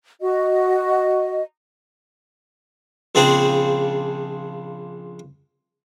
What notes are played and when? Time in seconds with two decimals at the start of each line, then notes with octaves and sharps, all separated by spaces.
0.22 F#4 D#5
3.15 A#1 C#3 C4 D4 G#4 C5